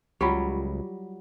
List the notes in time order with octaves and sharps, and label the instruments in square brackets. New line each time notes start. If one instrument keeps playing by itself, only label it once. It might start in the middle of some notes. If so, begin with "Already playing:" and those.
[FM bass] C#2 [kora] F#3 G3 [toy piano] F4 G4